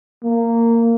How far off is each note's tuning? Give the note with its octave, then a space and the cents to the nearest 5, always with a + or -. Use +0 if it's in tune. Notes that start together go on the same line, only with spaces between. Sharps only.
A#3 -15